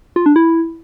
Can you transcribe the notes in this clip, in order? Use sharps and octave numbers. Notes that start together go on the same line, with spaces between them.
F4
D4
E4